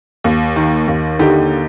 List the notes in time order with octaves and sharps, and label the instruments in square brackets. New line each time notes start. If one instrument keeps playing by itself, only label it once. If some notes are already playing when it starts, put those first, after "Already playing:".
[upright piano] D#2
D#3
D#2
D3 D#4 G4